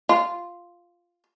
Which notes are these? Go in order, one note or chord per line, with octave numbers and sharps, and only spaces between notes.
F4